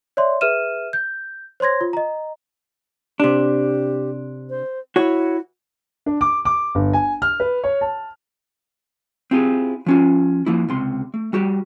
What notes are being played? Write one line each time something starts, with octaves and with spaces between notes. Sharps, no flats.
C#5 D5 E5 C6
G#4 B4 E5 F6 D#7 E7
G6
C5 C#5 C6 G#6 A#6
F4
D#5 A#5
C3 D4 G4
C5
E4 F#4 C#5
D4
D6
D6
G1
G#5
F6
B4
C#5
A5
C4 E4 F4 G4 G#4
F3 C#4 F4
F3 A#3 E4
C#2 C3 C6
A3
G3 F#4 G4